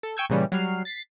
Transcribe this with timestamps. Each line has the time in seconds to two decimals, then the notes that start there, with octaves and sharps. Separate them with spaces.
0.03 A4
0.17 G5 G#5 C#6 E6 G6 G#6
0.29 A#2 C#3 E3 G3 C#4
0.52 F#3 G3 F6 C7
0.85 A6 B6 C7